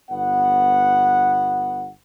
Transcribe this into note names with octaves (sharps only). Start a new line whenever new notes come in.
G1 B3 F#5